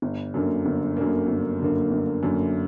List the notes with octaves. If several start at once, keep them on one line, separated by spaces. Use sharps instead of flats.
G1
F#2 D3 A#3
G1
F#2 D3 A#3
G1
F#2 D3 A#3
G1
F#2 D3 A#3